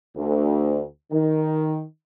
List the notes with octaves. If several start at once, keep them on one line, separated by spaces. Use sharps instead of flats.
D2
D#3